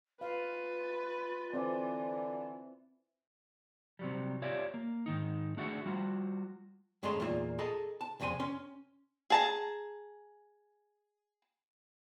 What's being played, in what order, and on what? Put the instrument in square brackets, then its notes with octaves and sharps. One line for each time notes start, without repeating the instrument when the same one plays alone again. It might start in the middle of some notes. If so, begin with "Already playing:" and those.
[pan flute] F4 [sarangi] B4 [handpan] F5
[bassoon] D3 [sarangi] E3 [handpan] C4 D5
[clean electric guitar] C3 F#3 G3
F4 G4 C#5 D5 E5 F5
A#3
G#2 D#3 D#4
A3 D4 F#4 G#4 E5 F#5
G3 F4 F#4
[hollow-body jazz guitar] F#2 C#3 G#3 A3 A#5 C6
E2 A#2 A#3 F4 E5
G#4 A4 D#5 A5 A#5
A5
C2 F2 C#3 F#5 G#5 C6
C#4 C6
[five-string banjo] G#4 A5 A#5